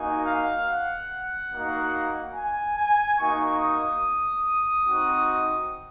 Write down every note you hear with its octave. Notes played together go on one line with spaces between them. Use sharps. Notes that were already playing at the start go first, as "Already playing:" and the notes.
Already playing: A#3 D#4 F#4 G#5
F5
F#5
A#3 D#4 F#4
G#5
G#5
A#3 D#4 F#4 C#6
D#6
C4 D#4 F#4